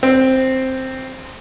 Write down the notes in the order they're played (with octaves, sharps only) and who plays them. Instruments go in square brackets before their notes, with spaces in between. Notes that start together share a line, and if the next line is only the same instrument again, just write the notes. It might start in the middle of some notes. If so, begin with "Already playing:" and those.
[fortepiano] C4